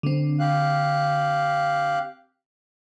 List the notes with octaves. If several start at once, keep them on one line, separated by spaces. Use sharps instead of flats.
D3 C4
G4 F5 F#6